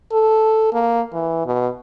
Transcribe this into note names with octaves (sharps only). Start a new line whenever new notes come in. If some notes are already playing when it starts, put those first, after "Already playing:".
A4
A#3
E3
B2